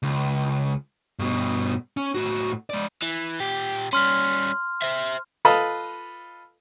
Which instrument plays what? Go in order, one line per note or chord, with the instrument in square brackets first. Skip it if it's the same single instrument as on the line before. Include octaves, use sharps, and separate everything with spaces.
[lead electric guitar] C#2
G2 B2
C#4
A2 F#4
G#3 D5
[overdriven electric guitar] E3
A#2 G4
[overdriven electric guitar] G3 C#4 [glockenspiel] C6 F6
[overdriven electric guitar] C5 E5
[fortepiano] F4 A4 B4 D#5 F5 A5